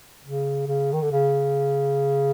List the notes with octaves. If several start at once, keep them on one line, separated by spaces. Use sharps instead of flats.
C#3
C#3
D#3
D3
C#3